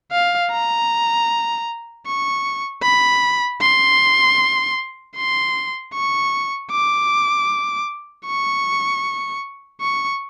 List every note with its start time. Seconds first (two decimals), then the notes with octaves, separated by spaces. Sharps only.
0.12 F5
0.52 A#5
2.07 C#6
2.83 B5
3.62 C6
5.16 C6
5.94 C#6
6.72 D6
8.26 C#6
9.81 C#6